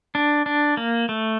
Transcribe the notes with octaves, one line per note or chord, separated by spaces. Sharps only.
D4
D4
A#3
A3